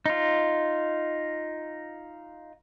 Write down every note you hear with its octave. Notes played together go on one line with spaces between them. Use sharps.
D#4 F4